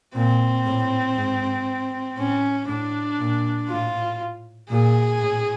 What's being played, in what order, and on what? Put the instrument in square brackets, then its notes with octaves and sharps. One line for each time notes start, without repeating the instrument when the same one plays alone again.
[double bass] A#2 [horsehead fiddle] C4
[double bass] A2
G#2
[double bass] A2 [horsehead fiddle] C#4
[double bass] A2 [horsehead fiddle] D4
[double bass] A#2
[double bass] A2 [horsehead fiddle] F4
[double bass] A#2 [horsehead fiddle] G#4
[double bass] A2